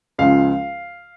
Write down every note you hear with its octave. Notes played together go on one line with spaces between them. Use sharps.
C#2 C#3 F3 F5